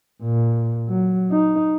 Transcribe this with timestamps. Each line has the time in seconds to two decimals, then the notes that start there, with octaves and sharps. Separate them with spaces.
0.22 A#2
0.89 F#3
1.31 D#4